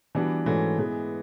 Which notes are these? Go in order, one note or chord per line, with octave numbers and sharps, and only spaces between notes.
E3 G3 B3 D4 F#4
G#2 E3 A3 C#4 F#4
E3 G#3 B3